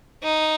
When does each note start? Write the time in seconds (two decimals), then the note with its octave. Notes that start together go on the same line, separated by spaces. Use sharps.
0.24 D#4